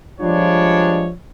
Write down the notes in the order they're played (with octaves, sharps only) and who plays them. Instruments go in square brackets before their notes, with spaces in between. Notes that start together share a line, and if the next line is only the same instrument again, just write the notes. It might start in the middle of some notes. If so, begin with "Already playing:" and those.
[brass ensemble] F3 G3 G#3 D4 F4 C#5